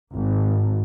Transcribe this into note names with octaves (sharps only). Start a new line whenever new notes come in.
G#1